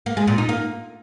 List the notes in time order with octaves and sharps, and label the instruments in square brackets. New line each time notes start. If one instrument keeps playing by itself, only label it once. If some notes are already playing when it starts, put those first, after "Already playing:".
[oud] A#3
G#3
A#2
D#4
A#3